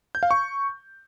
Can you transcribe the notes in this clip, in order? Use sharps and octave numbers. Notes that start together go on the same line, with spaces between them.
G6
F5
C#6